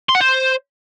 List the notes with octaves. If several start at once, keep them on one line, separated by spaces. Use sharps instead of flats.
C6
F#5
C5